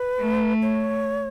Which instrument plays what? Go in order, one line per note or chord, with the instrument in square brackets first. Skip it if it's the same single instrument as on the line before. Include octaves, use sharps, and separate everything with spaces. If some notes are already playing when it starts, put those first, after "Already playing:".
Already playing: [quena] B4
[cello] A3
[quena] C#5